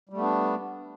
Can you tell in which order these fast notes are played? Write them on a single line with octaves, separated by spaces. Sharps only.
G3 A3 B3 D4